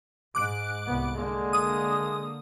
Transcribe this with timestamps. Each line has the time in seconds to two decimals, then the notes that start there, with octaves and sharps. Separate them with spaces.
0.35 G#2 D6 F#6 D7
0.86 C2 B3
1.15 D3 G#3 A#3
1.53 D#6